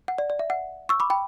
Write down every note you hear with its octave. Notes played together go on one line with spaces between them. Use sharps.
F#5
D5
D5
E5
F#5
C#6 E6
B5 D6
G5 B5